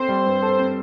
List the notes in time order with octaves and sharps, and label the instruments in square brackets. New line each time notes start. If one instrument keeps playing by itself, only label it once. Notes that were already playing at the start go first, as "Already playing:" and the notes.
Already playing: [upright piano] C4 A4 [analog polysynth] C5
[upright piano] G3
G2
A4
C4